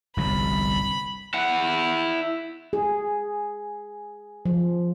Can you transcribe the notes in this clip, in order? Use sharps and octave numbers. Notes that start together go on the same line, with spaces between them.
G1 C2 F2 B5
E4 F#5
G#4
F3